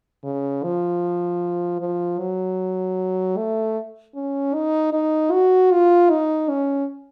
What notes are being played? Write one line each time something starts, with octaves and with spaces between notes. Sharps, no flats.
C#3
F3
F3
F#3
A3
C#4
D#4
D#4
F#4
F4
D#4
C#4